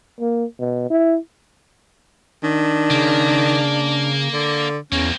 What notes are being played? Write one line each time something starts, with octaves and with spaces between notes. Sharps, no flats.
A#3
B2
E4
D#3 D4
C#3 A#3
D3
E2 A#3 C4 C#4